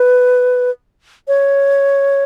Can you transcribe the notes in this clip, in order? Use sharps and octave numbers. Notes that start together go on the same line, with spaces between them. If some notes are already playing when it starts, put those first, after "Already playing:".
Already playing: B4
C#5